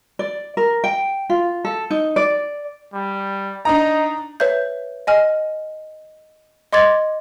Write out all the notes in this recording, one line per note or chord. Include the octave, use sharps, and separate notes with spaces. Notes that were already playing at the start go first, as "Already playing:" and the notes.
D5
A#4
G5
F4
A4
D#4
D5
G3
D4 D#4 A#5
B4 C#5 E5 G6
D#5 G#5 F6
D#5 C6 D6 G#6 A6